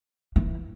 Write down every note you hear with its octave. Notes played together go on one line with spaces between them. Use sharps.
E3